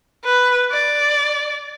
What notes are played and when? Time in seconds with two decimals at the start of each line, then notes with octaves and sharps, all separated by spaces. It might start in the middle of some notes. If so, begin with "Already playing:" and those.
0.25 B4
0.72 D5